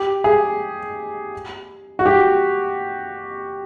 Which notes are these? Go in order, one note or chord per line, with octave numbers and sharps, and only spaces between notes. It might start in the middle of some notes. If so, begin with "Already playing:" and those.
Already playing: G4
G#4
F#4
G4